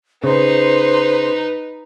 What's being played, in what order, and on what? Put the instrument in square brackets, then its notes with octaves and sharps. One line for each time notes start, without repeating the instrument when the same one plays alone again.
[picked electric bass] C#3 [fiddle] D#4 B4 [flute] C5